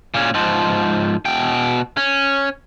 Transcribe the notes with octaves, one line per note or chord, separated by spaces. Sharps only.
A#2 C#4
G#2 F3
B2 G5
C#4